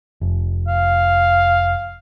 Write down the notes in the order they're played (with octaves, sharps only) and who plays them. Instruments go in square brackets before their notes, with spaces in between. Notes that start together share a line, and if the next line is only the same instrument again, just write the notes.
[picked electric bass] F1
[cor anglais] F5